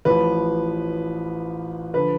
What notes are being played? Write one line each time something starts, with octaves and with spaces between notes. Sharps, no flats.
A1 A2 F3 B4
D3 F3 B4